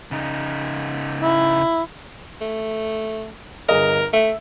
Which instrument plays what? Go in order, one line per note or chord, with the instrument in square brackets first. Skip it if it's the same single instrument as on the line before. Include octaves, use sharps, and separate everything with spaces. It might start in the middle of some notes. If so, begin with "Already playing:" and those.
[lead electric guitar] C#3 D#4
[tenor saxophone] E4
A3
[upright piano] G1 G#4 D#5 [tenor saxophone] A#4
[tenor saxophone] A3 [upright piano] E5